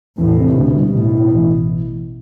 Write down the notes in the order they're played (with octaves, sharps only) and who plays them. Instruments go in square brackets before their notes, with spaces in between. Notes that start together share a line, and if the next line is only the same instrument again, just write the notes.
[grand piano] E2 [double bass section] A2
[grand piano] C3
[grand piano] D2 [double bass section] B2
[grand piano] G3
A2
E4
A1